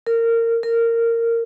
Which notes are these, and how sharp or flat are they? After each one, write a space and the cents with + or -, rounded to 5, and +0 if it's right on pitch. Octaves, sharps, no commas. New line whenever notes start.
A#4 -20
A#4 -15